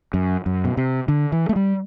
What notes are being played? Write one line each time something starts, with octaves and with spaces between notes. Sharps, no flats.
F#2
F#2
B2
C3
D3
E3
A3
G3